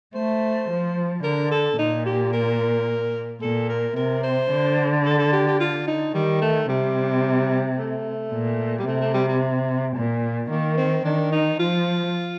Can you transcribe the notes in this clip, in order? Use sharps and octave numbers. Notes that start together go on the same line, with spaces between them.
A3 C5
F3
D3 A#4
A4
A#2 D#4
G4
A#4
A#2 A4
A#4
C3 A#4
C5
D3
A4
A4
G4
G4
F4
D#4
D#3 G3
A3
C3 G3
A3
A#2
G3
C3 A3
A3
G3
G3
A#2
D#3 A#3
C4
D#3 D4
D#4
F3 F4